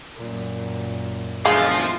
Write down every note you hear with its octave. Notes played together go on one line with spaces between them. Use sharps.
F#2 A#2
E2 D3 F3 G#3 F5